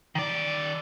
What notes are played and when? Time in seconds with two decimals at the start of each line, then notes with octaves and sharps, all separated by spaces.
0.15 D#3 D5